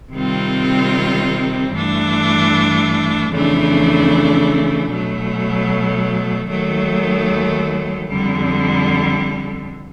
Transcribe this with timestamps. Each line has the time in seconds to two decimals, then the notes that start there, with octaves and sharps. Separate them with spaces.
0.14 C3 D#3 G3 C4 F4
1.72 G2 E3 A3 D4
3.31 F2 C#3 E3 A3 D4
4.90 B2 F#3 A3
6.49 D#2 D#3 F#3 A3
8.09 F2 D3 G3